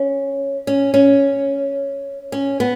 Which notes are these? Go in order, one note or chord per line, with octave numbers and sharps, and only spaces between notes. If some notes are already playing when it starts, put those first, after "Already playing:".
Already playing: C#4
C#4
C#4
C#4
B3